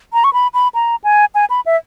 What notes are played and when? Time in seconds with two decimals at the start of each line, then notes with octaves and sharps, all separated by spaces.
0.13 A#5
0.24 C#6
0.33 B5
0.54 B5
0.74 A#5
1.04 G#5
1.35 G#5
1.50 B5
1.66 E5